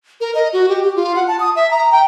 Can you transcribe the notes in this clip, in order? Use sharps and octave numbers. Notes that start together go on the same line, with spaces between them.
A#4
D#5
F#4
G4
G4
F4
F#5
A5
D#6
E5
A#5
G5